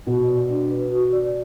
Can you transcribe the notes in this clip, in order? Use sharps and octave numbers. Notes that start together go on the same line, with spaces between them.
B2 F#4
D5
D4
B4
F#4
D5